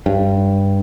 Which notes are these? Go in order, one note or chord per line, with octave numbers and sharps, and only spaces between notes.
G2